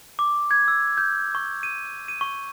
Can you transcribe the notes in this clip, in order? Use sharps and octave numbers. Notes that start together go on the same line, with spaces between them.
D6
G#6
E6
G6
C#6
D#7
D#7
C#6